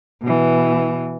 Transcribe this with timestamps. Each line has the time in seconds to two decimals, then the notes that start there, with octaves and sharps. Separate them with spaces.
0.22 B2 E3